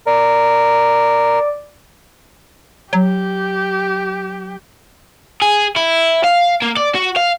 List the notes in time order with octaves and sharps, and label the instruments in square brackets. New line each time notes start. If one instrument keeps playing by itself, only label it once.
[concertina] A#4 [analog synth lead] D5
[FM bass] F#3 [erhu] G4
[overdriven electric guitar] G#4
E4
F5
A#3
D5
F#4
F5